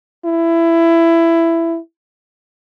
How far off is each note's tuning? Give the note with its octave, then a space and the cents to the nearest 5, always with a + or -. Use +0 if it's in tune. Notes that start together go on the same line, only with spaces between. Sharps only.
E4 +15